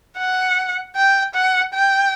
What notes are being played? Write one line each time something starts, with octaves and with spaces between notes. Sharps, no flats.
F#5
G5
F#5
G5